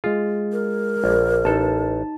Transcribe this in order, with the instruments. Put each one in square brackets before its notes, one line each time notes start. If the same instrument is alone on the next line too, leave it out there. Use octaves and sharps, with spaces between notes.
[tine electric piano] G#3 G#4 [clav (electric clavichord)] F4
[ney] A#4
[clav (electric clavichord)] A#1
[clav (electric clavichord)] A1 A4 [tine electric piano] D#4 A5